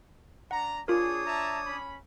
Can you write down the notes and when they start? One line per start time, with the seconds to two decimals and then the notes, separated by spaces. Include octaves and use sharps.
0.51 D4 F#5 A#5
0.88 D4 F4 G#4 A#4 C#5 D#6
1.26 E5 A5 A#5
1.67 C#4 B5